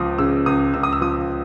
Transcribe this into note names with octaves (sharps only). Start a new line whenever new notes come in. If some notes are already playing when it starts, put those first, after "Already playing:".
Already playing: C#2 F3 D6 D#6
C#3 E6
C#2 D#6
C#2 E6
D#6
E6
F3 D#6